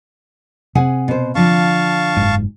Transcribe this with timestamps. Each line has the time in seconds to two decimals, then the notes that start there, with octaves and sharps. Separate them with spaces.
0.75 C3 C4 G#4 F#5 G#5
1.08 B2 C5
1.35 D3 F3 F5 A5 C#6
2.17 F#1 G#2